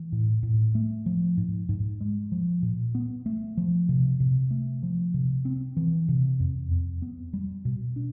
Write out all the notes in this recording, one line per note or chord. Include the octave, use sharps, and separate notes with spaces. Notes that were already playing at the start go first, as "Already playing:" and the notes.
Already playing: E3
A2
A2
A3
F3
G#2
G#2
G#3
F3
A#2
B3
A3
F3
C3
C3
A3
F3
C3
C4
E3
C3
F2
F2
B3
G3
B2
D4